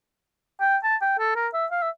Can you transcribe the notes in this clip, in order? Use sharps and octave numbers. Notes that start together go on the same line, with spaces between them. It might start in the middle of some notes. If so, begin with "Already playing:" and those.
G5
A5
G5
A4
A#4
E5
F5
E5